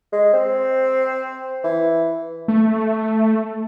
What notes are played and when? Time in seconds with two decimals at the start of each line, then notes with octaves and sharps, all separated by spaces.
0.12 G#3
0.33 C4
1.64 E3
2.48 A3